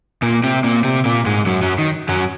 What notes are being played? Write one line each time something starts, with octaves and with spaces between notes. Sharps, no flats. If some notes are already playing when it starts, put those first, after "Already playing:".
A#2 A#3
C3 C4
A#2 A#3
C3 C4
A#2 A#3
G#2 G#3
F#2 F#3
F#2 F#3
D#3
F#2 F#3